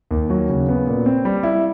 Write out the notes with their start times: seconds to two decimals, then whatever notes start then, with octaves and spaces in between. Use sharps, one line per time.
0.11 D#2
0.30 F#3
0.49 C#3
0.69 B3
0.87 A#2
1.06 C4
1.25 G3
1.43 E4